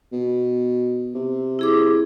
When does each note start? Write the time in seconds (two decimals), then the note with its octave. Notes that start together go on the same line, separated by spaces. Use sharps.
0.12 B2
1.15 C3
1.59 E4 G#4 D6